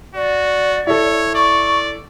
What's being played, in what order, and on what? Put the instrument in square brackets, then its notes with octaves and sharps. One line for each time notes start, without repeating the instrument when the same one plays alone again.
[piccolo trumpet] F#4 [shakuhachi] D5
[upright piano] E4 A4 [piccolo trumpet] C#5
[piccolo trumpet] D5 [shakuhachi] C#6